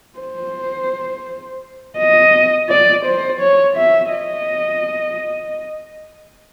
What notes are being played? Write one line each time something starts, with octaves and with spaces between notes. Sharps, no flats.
C5
D#5
D5
C5
C#5
E5
D#5